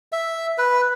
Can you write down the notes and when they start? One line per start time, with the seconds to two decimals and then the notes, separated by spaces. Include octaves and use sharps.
0.12 E5
0.58 B4